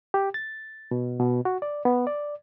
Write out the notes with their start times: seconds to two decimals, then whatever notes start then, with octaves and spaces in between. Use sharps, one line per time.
0.14 G4
0.34 A6
0.91 B2
1.20 B2
1.45 F#4
1.62 D5
1.85 B3
2.07 D5